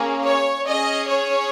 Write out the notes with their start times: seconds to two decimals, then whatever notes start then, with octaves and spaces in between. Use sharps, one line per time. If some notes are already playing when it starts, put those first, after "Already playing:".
Already playing: A#3 C#4 G#4
0.25 C#5
0.67 C#4 G#4 D#5
1.08 C#5